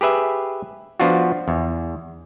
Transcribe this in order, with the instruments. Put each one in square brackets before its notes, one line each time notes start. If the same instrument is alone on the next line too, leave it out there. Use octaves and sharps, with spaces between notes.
[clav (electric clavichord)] G4 G#4 B4 E5
F3 B3 D4 F4 F#4
E2